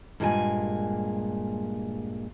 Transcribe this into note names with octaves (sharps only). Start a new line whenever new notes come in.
G2 A#2 G#3 G4 G#5